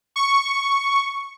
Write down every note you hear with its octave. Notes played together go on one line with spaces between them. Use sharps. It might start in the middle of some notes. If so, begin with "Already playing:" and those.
C#6